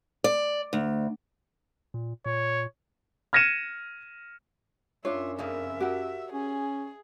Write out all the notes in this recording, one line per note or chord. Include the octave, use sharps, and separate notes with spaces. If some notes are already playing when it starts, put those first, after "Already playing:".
D5
D2
A#2
A#2 C#5
F6 G#6 A#6 C#7 D#7 E7
F#2 D4 F4 C#5 E5
F2 C#3 A#3 E5
F#4 G4 A#4
C#4 G#4